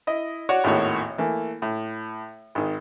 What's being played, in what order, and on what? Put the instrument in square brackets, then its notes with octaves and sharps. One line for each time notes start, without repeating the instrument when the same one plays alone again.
[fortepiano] E4 D#5
F#4 C#5 D5 F#5
G#1 D#2 A2 D#3 F#4 C#5
E3 A3 A#3
A2
G#1 D#3